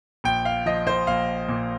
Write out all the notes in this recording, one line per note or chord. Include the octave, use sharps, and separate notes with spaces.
A#1 G5
F5
F3 D#5
C5
A#1 F5
A#2